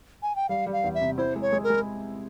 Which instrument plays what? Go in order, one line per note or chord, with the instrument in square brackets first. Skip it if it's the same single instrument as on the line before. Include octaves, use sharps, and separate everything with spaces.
[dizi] G#5
G5
[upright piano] G3 [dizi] F5
[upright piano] G3
[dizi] F5
[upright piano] E2
[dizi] E5
[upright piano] C3
[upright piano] E4 [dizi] C5
[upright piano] G#3
[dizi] C#5
[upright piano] G#3
[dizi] A#4
[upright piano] G#3